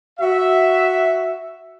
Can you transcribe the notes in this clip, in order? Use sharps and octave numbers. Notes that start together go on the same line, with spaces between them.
F#4 E5